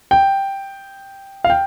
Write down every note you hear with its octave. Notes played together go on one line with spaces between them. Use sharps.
G5
F5
G5